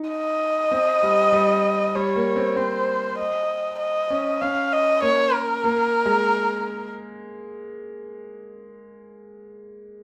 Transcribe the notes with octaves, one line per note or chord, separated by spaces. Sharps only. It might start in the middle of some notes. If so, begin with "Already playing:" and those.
Already playing: D#4
D#5
C4
G3
G3
G3 C#5
A#3
C4
C4 C5
D#5
D#5
C#4
C#4 F5
D#5
A#3 C#5
A#4
A#3
G#3